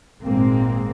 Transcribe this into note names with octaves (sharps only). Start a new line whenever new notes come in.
G#1 A#2 G#3 A#3 C4